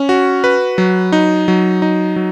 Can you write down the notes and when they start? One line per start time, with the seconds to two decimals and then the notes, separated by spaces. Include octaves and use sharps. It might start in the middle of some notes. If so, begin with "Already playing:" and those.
Already playing: C#4
0.09 F#4
0.44 B4
0.78 F#3
1.12 D#4
1.48 F#3
1.82 D#4
2.16 F#3